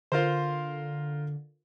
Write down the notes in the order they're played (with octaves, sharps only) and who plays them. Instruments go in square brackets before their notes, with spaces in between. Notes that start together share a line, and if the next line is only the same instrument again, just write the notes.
[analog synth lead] D3 [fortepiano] F4 A#4 C5